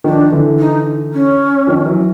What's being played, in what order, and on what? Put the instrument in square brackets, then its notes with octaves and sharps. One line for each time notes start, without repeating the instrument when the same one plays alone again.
[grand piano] D#3 F3 [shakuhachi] D4
[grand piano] D3 E3
[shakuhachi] D#4
C#4
[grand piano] D#3 F3
E3 F#3